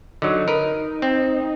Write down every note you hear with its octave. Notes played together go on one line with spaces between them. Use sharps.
D3 F#3 D#4
A#4 B4
C4